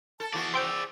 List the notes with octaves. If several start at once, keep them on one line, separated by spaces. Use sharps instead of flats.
A4 A5
E3 F#4 G#4 D5
C5 G5 E6 D7